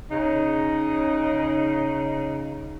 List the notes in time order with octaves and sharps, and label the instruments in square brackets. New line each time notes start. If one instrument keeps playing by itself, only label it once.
[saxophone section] C#3 D#4